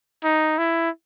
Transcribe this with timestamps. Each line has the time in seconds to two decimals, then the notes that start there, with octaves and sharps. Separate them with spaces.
0.24 D#4
0.58 E4